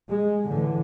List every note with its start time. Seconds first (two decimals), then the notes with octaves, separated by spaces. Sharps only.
0.10 G#3
0.47 A2 D3 E3